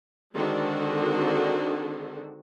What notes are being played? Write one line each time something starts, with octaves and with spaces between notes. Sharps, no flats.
D3 D#3 G#3 C4 D4 F#4